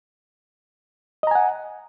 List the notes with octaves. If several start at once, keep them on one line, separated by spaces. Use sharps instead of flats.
D#5 F#5 G#5 A#5